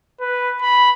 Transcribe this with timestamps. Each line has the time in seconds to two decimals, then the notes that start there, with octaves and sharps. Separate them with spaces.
0.21 B4
0.62 B5